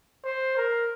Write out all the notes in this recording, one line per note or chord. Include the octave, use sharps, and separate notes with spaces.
C5
A#4